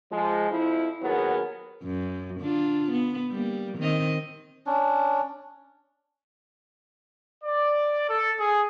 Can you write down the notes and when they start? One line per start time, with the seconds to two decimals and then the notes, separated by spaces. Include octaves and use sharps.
0.12 F3 G#3
0.50 F2 F3 E4
1.01 D#2 F#3 B3 G#4 A#4
1.83 F#2
2.41 D3 D4 F4
2.92 B3
3.32 G3 A#3
3.78 D#3 C4 D#5
4.66 C#4 D4
7.43 D5
8.08 A4
8.38 G#4